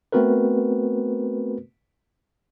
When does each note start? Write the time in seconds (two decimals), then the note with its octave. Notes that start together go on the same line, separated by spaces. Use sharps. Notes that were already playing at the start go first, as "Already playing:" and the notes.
0.12 A3 B3 C4 F#4 A#4 B4